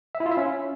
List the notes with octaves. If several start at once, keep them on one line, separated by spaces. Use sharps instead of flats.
E5
E4
F4
E5
C#4